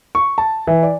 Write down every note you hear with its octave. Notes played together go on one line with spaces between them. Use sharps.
C#6
A5
E3
D5